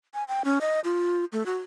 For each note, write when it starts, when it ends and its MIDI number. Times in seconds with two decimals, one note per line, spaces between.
0.14 0.24 80
0.28 0.42 79
0.45 0.59 61
0.61 0.80 75
0.84 1.25 65
1.32 1.45 57
1.46 1.58 66